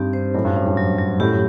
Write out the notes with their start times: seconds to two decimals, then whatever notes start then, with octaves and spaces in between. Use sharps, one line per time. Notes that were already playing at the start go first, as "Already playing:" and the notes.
Already playing: G2 C4 D#4 G4
0.13 C5
0.34 F#2 A2 F#3
0.45 G2
0.56 F#2 D4
0.67 G2
0.77 F#3
0.98 F#3
1.20 F#2 A2 G4